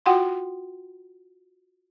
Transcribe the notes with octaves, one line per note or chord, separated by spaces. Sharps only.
F4 F#4 F#5 G5 C6